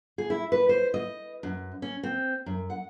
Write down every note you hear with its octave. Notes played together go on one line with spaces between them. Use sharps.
G#4
E4
B4
C5
D#5
F#2
C#4
C4
F#2
F#5